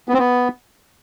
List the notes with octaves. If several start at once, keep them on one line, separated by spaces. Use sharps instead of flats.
B3
C4
B3